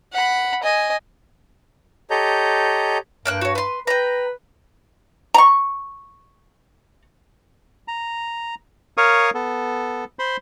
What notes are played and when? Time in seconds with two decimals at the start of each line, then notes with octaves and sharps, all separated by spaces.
0.13 F#5 B5
0.63 D#5 G#5
2.10 G4 A4 C#5 D#5 A#5 G6
3.26 G2 A#3 G5 F#6
3.41 F#4 C#5
3.55 B4 C6
3.87 B4 G5 A#5
5.34 A#5 C#6
7.88 A#5
8.97 A#4 C#5 F5 C#6 D#6
9.34 B3 A4
10.19 C5 B5 C6